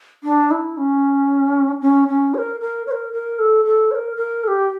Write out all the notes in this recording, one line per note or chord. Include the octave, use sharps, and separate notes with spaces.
D4
E4
C#4
C#4
C#4
C#5
A#4
A#4
C#5
A#4
A#4
A4
A4
C#5
A#4
A#4
A4
G4